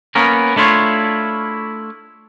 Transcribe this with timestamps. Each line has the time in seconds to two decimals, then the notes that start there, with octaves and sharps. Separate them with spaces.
0.15 A#3 B3 C#4 A#4
0.56 A3 D4 E4 F4 C#5